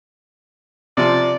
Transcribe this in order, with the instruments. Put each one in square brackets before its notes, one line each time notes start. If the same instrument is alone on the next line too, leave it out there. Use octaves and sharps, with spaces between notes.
[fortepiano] C3 F3 C6 [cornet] D5